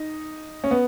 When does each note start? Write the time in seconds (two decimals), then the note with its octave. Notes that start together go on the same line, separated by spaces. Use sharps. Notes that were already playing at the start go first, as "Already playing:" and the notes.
Already playing: D#4
0.64 C#4
0.71 B3